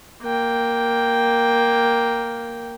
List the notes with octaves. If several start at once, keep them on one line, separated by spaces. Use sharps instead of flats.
A#3 G5